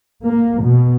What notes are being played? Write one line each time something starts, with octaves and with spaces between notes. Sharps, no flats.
A#3
B2